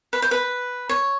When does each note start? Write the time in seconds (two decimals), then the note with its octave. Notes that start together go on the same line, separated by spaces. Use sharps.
0.13 B4
0.22 C5
0.31 B4
0.89 C#5